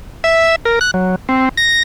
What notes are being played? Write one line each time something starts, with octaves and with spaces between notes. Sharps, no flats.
E5
A#4
F#6
F#3
C4
A#6